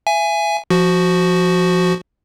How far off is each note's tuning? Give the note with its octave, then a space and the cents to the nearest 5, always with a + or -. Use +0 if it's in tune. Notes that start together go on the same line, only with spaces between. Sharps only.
E5 +30 G#5 +0
F3 -5 F#4 +0